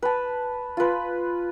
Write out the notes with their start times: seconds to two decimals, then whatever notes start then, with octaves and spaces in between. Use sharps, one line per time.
0.02 B4 A5
0.77 F4 B4